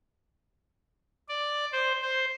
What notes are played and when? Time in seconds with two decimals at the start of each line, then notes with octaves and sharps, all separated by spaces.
1.29 D5
1.73 C5
2.02 C5